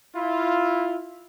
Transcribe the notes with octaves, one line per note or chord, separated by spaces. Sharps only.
E4 F4